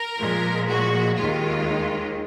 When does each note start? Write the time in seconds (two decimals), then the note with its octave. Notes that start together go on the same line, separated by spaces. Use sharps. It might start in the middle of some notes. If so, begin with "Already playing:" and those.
Already playing: A#4
0.19 A#2 F3 G#3
0.68 F#4
1.16 D#2 D#3 G#3 F4